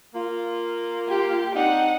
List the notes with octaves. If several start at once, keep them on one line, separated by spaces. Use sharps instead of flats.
A#3 F4
G4
C4 D4 D#4 F#5